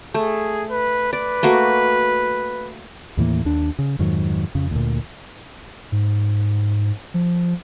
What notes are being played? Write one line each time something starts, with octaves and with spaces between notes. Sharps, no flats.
A3 G#4
B4
B4 D5
A3 A#3 F#4
D#2 A2 E3 A#3
D#2 D4
C#3
F2 G#2 D#3 F#3
F2 C#3
D2 A#2
G#2
F3